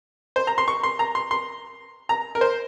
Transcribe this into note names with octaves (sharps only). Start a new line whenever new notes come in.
C5
A#5
C6
C#6
C6
A#5
C6
C6
A#5
A#4
C5